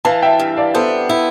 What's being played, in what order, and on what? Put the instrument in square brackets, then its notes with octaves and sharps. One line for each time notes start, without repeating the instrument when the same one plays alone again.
[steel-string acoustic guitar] E3 [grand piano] F5 A5
[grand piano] E5 G5
[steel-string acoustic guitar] G2
[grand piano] D5 F5
[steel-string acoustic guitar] B3 [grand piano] A4 C5
[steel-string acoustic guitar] E4